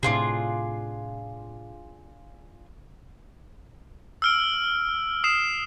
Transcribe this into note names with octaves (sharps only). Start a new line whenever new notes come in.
A2 C3 D4 F4 G#4
E6 F6 D7
D#6 C7 E7